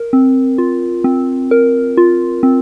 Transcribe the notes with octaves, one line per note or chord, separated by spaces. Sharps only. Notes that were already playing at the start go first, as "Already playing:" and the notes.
Already playing: A#4
C4
F4
C4
A#4
F4
C4